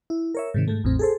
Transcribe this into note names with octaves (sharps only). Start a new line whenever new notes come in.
E4
A#4 C#5 E5
G#2 C3 D#3
G#2 A3
A1 E2 A2 C4
G#4 A4 C5